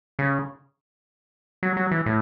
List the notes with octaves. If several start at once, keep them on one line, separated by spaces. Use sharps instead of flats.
C#3
F#3
F#3
E3
A2